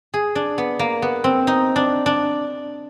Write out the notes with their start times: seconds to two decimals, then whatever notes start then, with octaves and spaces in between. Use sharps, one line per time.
0.14 G#4
0.35 D4
0.58 B3
0.79 A#3
1.02 B3
1.24 C4
1.47 D#4
1.76 D4
2.06 D4